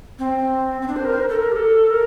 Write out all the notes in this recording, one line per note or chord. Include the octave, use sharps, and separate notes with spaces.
C4
C4
D4
C5
A#4
C5
A#4
A4
A#4
G4
A4
A#4